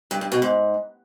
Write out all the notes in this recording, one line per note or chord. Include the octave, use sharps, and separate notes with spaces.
G2
G2
B2
G#2